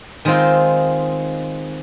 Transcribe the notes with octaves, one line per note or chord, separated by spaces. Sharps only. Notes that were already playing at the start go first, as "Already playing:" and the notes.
D#3 G#3 C4 F4